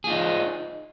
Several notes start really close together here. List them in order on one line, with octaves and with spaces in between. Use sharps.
G#4 F4 D#4